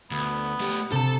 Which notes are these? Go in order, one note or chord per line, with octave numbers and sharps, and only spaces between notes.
D2 B3
A3 G4
C3 A4 A5